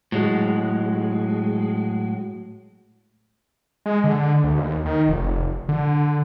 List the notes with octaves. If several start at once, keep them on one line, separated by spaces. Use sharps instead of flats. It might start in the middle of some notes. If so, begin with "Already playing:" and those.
A2 F#3 G#3
G#3
D3
D2
D#2
D#3
F1
D3